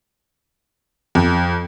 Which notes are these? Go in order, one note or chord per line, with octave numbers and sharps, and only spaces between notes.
F2